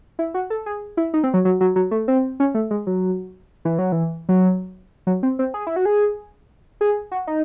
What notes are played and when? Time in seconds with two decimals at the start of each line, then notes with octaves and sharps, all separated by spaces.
0.19 E4
0.34 F#4
0.50 A4
0.66 G#4
0.97 E4
1.14 D#4
1.24 C4
1.34 F#3
1.45 F#3
1.61 F#3
1.76 F#3
1.91 A3
2.08 C4
2.40 C#4
2.55 A3
2.71 G#3
2.87 F#3
3.65 E3
3.79 F#3
3.92 E3
4.29 F#3
5.07 F#3
5.23 C4
5.39 C4
5.54 G#4
5.67 E4
5.76 F#4
5.85 G#4
6.81 G#4
7.12 F#4
7.27 D#4